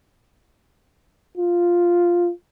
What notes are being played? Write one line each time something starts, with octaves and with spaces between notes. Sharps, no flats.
F4